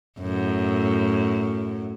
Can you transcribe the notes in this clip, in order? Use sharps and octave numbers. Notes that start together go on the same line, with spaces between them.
F#2 A2